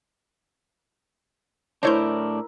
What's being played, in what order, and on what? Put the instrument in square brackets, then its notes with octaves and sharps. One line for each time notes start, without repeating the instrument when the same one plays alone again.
[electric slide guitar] A2 D4 [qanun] E4 A#4 A#5 [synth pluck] C5 C#5 G6